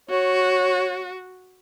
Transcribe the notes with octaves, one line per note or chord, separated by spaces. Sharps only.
F#4 C#5